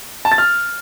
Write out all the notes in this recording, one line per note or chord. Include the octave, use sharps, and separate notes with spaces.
A5
A6
F6